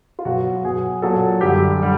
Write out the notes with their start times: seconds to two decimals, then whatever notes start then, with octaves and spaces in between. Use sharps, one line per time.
0.19 F4
0.25 B2 F#3 F#4
0.64 B2 F#3 G#4
1.02 A#2 F#3 A4
1.41 F#2 D3 G3 G4
1.82 D3 G3